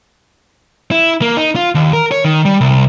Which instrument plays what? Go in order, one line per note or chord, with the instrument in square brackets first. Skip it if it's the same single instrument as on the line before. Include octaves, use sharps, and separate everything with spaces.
[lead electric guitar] E4
A#3
D#4
F4
D#2
A#4
C#5
D#3
G3
C2